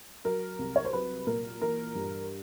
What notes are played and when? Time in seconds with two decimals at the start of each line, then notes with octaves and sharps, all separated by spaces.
0.24 F#3 A#4
0.59 C2
0.76 C#5
0.85 C5
0.93 F#3 B4
1.27 A#2 A#4
1.62 E3 A#4
1.95 G2